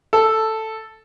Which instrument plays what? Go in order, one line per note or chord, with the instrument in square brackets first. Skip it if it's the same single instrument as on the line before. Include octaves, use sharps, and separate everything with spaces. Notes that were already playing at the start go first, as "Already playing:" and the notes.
[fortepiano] A4